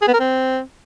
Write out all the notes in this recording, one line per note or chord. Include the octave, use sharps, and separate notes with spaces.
G#4
B3
A#4
C4